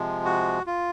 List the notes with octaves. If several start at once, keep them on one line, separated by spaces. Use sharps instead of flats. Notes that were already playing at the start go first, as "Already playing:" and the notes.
Already playing: C3 F3 G#3
F#4
F4